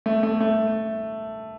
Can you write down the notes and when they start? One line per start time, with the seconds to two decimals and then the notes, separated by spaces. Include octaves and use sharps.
0.06 A3
0.23 A3
0.40 A3